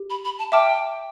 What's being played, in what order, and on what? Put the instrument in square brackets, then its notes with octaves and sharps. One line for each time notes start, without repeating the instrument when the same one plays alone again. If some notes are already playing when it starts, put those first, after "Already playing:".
Already playing: [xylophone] G4
[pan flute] B5
B5
A5
[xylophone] E5 A5 D6 F6 [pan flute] G5